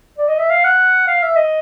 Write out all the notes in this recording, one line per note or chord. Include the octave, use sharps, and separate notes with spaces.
D5
D#5
E5
F5
F#5
F5
E5
D#5